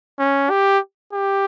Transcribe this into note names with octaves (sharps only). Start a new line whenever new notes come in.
C#4
G4
G4